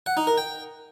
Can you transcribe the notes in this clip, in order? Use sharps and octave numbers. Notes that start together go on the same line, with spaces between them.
F#5
D#4
A#4
G5